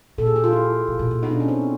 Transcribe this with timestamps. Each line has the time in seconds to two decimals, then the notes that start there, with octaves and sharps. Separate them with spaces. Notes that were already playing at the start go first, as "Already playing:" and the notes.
0.18 A#2 A4
0.26 G#4
0.36 G4
0.44 F4
0.53 E4
0.88 A#2
0.99 A#2
1.11 A#2
1.22 B2 D#4
1.31 D4
1.40 C#4
1.48 C4